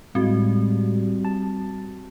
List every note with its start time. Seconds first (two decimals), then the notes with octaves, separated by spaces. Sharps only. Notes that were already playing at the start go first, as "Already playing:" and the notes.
0.15 A2 G3 G#3 C4 F#4
1.25 A5